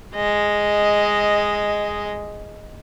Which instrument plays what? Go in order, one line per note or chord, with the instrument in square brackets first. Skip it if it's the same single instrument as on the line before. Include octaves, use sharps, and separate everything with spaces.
[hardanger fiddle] G#3 D#5